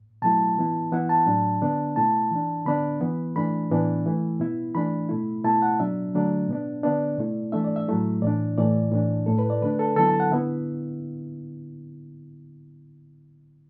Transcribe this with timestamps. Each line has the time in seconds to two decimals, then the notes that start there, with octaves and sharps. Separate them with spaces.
0.22 B2 F#3 A3 E4 A5
0.58 E3 B3 E4
0.92 E3 B3 E4 F#5
1.09 A5
1.26 A2 F#3 D4
1.62 D3 B3 D4
1.96 B2 A3 E4 A5
2.31 E3 D4
2.66 D3 B3 D4 B5
3.01 E3 B3 E4
3.36 E3 A3 D4 B5
3.70 A2 E3 B3 D4
4.06 E3 A3 E4
4.40 B2 B3 E4
4.75 E3 A3 D4 B5
5.09 B2 A3 E4
5.44 B2 A3 E4 A5
5.62 F#5
5.80 B2 F#3 D4 E5
6.14 D3 F#3 A3 D4
6.48 B2 B3 D4
6.83 D3 B3 D4 D5
7.18 B2 A3 E4
7.52 E3 A3 D4 E5
7.64 D5
7.76 E5
7.88 A2 F#3 A3 E4
8.22 A2 E3 D4 D5
8.58 A2 E3 A3 E4 D5
8.92 A2 E3 D4
9.26 A2 A3 E4 A4
9.39 B4
9.50 D5
9.62 D3 A3 D4 B4
9.79 A4
9.96 D3 F#3 B3 E4 A4
10.09 A5
10.20 F#5
10.31 D3 B3 E4 E5